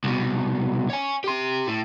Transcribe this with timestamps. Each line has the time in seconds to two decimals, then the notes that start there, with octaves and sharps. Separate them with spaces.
0.04 C2 B2
0.90 C#5 G#5
1.24 G4 C6
1.67 A2